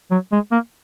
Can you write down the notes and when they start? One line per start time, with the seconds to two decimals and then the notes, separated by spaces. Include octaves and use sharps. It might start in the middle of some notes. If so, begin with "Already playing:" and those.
0.11 F#3
0.32 G#3
0.52 A#3